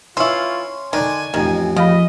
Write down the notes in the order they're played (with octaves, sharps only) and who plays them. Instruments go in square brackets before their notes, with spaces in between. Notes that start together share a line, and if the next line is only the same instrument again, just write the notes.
[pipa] E3 E4 [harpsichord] C#4 [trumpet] F4 [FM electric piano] C6 C#6
[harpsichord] D3 D4 [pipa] D#3 [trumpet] G#5
[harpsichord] A1 F2 [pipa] D#3
[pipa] C#3 [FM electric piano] F3 F5 B5 [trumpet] D#5